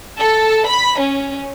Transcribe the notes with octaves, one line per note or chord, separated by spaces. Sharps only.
A4
B5
C#4